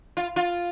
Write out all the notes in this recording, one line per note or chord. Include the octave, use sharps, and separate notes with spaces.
F4
F4